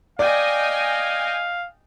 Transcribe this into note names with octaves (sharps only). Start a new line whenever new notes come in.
D5 D#5 F5 G5 G#5